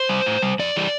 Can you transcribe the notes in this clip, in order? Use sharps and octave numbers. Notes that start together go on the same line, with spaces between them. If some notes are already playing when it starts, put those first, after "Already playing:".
Already playing: C5
G3
A2
G3
F2 D5
E3 G3